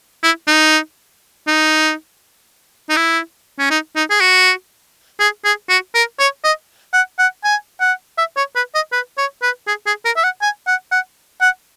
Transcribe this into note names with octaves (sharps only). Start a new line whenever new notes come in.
E4
D#4
D#4
D#4
E4
C#4
D#4
D#4
G#4
F#4
G#4
G#4
F#4
A#4
C#5
D#5
F#5
F#5
G#5
F#5
E5
C#5
B4
D#5
B4
C#5
B4
G#4
G#4
A#4
E5
F#5
G#5
F#5
F#5
F#5